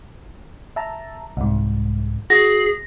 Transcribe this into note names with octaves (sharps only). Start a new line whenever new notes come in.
E5 A5 A#5
C2 G#2
F#4 G#4 A#6